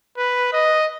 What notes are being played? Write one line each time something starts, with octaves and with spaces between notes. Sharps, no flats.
B4
D#5